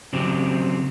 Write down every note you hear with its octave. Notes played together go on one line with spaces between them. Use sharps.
C#3 F#3 C4 G4